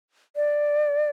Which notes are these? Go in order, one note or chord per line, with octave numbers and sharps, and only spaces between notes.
D5